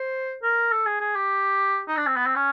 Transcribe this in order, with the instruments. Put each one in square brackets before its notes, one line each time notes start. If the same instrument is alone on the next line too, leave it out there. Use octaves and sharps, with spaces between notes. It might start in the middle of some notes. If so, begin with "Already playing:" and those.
Already playing: [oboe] C5
A#4
A4
G#4
G#4
G4
D#4
D4
C4
B3
C4
C#4